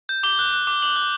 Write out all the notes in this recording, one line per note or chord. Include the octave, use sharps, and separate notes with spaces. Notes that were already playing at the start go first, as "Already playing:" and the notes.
G6
D6 G7
F#6
F#6
D6
D6 F#7
F#6